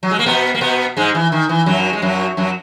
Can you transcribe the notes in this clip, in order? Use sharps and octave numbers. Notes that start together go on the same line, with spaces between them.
F#3
G#3
A#3
B2 B3
A#3
B2 B3
G#2 G#3
E3
D#3
E3
F#2 F#3
G#3
F#2 F#3
F#2 F#3